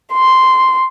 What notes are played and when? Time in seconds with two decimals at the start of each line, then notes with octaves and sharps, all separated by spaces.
0.14 C6